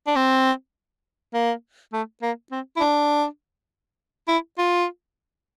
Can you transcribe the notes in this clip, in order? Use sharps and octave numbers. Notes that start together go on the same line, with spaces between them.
D4
C4
A#3
A3
A#3
C4
E4
D4
E4
F4